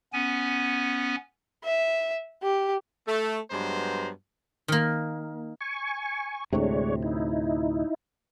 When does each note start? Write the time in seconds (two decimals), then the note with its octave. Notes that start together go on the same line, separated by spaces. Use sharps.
0.13 B3 C#4 G#5
1.64 E5
2.43 G4
3.07 A3
3.51 G2 F#3 G#3 B3 C5 A#5
4.68 D#3 A#3
5.61 G#5 C#6
6.53 D2 A2 C3 G#3 D4 C#5
7.03 D#4 E4